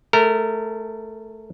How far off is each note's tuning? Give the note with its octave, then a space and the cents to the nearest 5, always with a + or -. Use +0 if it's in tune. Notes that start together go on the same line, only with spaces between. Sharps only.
A3 -15 A#4 -25